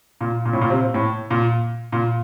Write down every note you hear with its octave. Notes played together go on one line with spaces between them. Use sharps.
A#2
A#2
A2
A#2
C3
A2
A#2
A#2